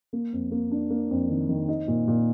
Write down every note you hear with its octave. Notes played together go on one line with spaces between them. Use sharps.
A#3
F2
A#3
D4
A#3
F2
D#3
D#3
D#4
A#2
A#2